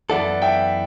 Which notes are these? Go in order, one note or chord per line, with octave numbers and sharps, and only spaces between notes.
F#2 E3 B3 E4 A4 D5 F#5
E5 G5